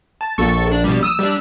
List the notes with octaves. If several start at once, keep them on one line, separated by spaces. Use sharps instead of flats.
A5
A#1 A4 A5 C#6
D4
B2 G3
D#6 E6
G3 D4